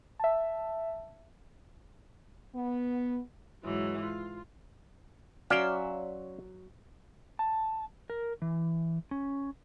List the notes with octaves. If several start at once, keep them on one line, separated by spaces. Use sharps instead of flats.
E5 A5
B3
G#2 E3 F#3
F4
F#3 C#4 D5 E5 F5 C6
A5
A#4
E3
C#4